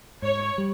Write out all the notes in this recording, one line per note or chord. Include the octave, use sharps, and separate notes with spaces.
G#2 C#5
G3